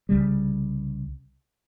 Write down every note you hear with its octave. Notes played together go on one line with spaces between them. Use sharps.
C2 C#3 G3